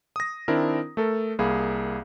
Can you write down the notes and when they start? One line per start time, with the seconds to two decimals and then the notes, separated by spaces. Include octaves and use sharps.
0.16 D#6 A#6
0.48 D#3 C4 D4 E4 A#4
0.97 A3 A4 A#4
1.39 C2 A#3 G#4 F5 B5